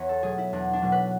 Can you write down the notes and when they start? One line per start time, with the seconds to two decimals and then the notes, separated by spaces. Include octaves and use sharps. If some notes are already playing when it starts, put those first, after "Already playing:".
Already playing: E2 B4 C#5
0.09 A4
0.23 B2 F#3 A3 G#4
0.38 E4
0.53 E2 D4
0.73 D4
0.82 B2 F#3 A3
0.92 B4